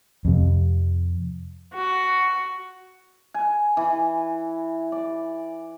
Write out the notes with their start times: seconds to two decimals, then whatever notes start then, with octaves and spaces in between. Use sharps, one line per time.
0.25 F2 C3
1.76 F#4
3.34 G#5
3.77 E3
4.92 D5